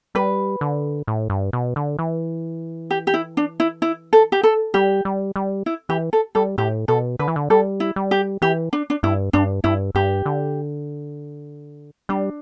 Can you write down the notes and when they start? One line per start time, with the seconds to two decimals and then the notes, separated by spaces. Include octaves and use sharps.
0.15 G3 B4
0.61 D3
1.07 A2
1.30 G2
1.53 B2
1.76 D3
1.99 E3
2.91 G4
3.07 G4
3.14 E4
3.37 D4
3.60 E4
3.82 E4
4.13 A4
4.32 G4
4.43 A4
4.74 G3 G4
5.05 G3
5.36 G3
5.66 E4
5.89 E3 G4
6.13 A4
6.35 G3 A4
6.58 A2 G4
6.88 B2 A4
7.19 D3 B4
7.28 E3
7.36 D3
7.50 G3 A4
7.80 E4
7.96 G3
8.11 G4
8.42 E3 G4
8.73 D4
8.90 D4
9.03 G2 E4
9.33 G2 D4
9.64 G2 E4
9.95 G2 G4
10.26 D3
12.09 G3 D4